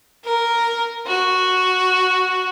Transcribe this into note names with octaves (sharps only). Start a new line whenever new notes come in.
A#4
F#4